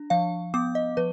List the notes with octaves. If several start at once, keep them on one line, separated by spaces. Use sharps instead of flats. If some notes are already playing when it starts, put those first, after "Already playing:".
Already playing: D4
F3 F5
B3 D6
D#5
F3 B4